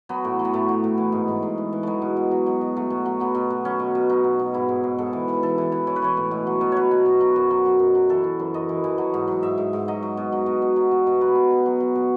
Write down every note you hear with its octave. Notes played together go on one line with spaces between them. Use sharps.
F#3 B3
A2
F#3
B3
A2 A3
F#3
A2
E3
G#2
G#2
G#2
E3
E3
F#3 G#3 A3
B2
B2
F#3
F#3
B2
F#3 A3
B2
F#3
F#3 B3
B2
B2
F#3 C#4
B2
B2
F#3 D#4
B2
B2
G#2 E4
G#2
G#2
G#2 A4
E3
E3
E3 A4
E3
E3
E3 C#5
B4
E3 C#5
A2
B2
F#3
B2
B2 B4 C#5
B2
B2
F#3
F#2
F#3
F#3
F#2
F#3
E3 A4
E3
F#2
F#2 D#5
E3
E3
F#3
G#2
F#3
G#2 E5
G#2
G#2
F#3 D#5
F#3
B2
F#3
B2
B2
F#3
B2
B2
F#3 B4
B2
B2
F#3
F#3
B2